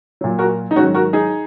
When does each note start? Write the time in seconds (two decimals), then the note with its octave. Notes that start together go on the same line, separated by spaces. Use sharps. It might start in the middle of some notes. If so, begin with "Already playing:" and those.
0.21 A#2 F#3
0.39 F#4 A#4
0.71 D#4
0.76 G#2 D#3 F#3 C#4 F#4
0.94 F#4 A#4
1.13 D#4 G#4